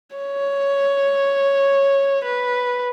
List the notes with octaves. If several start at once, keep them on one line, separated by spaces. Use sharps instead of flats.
C#5
B4